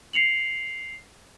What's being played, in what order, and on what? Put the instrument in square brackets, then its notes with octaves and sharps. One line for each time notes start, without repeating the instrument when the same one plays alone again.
[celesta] C7 C#7 F7 F#7